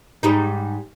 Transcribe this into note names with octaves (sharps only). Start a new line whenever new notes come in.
G#2 G3 D#4